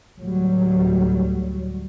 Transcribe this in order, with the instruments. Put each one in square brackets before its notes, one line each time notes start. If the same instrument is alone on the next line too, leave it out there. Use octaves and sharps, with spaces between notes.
[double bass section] D2 A2 F#3 G3